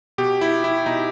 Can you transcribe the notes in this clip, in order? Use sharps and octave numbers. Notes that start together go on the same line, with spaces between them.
B2 G4
E4
E4
B2 D#4